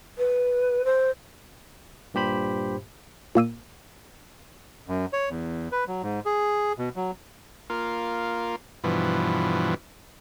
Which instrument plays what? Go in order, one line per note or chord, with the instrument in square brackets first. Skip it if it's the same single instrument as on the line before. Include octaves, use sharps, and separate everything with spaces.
[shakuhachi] B4
C5
[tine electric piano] G2 A#2 G4 C5 B5
[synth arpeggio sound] A#2 A#3 E6 D#7
[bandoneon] F#2
C#5
E2
B4
F#3
G#2
G#4
B2
F#3
[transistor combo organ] A#3 F4
G2 B2 E3 F3